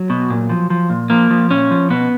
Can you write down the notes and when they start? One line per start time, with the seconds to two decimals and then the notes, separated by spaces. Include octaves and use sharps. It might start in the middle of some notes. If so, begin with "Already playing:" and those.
Already playing: F#3
0.10 B2
0.30 A#2
0.50 F3
0.70 F3
0.90 A#2
1.10 F3 A#3
1.30 F3
1.50 A#2 C#4
1.71 F3
1.90 B2 B3